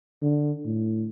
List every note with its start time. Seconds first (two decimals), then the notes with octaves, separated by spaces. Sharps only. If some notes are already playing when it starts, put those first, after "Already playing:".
0.22 D3
0.65 A2